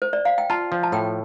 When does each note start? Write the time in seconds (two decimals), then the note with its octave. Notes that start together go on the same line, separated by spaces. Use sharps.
0.02 C5
0.13 D5
0.25 F5
0.38 G5
0.50 F4 A5
0.72 F3
0.83 A5
0.92 A2 G5